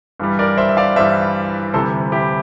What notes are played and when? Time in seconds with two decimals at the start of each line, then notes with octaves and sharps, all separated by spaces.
0.20 G2 E3 G3
0.39 A#4 D5
0.57 C5 E5
0.69 E5
0.77 D5 F5
0.96 G2 E3 G3 C5 E5
1.74 D2 C3 E3 G3 A4 C5
2.12 E4 G4